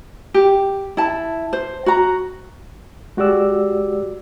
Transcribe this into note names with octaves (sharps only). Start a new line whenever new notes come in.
G4
E4 A5
C5
F#4 A#5
G#3 F#4 G4 D5 E6